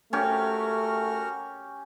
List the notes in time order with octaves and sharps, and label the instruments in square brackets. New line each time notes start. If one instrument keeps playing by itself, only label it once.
[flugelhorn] A3 [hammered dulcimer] C#4 G4 [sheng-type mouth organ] F#4 A#4 F6